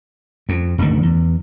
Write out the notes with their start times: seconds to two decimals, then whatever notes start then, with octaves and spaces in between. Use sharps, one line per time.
0.49 F2
0.78 F#1 D2 G#2 D#3
1.03 E2